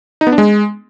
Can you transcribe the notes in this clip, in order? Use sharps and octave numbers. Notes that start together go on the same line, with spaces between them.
D#4
B3
D4
G#3